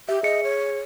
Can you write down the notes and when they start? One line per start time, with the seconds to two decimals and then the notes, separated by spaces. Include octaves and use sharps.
0.09 G4 E5
0.23 G#4 D#5 C#7
0.44 C#5